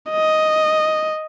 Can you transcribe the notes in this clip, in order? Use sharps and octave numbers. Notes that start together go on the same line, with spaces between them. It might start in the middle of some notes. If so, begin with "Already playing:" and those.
D#5